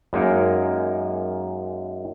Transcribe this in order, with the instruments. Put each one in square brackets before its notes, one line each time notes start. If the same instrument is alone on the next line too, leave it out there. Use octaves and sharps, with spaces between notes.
[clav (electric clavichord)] F#2 G#3 A#3 D#4 A#4